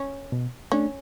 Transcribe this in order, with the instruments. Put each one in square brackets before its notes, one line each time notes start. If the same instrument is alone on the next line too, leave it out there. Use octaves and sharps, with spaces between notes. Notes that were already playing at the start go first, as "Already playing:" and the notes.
Already playing: [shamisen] C#4
[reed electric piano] B2
[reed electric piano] A3 D4 [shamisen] C#4